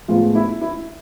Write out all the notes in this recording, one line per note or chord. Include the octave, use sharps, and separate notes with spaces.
A2 F3 G#3 B3 F4
E4
E4